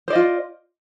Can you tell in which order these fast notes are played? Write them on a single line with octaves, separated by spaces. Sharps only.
C5 D5 D#5 F4